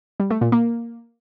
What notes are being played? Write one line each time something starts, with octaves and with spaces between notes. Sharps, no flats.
G3
A3
A#2
A#3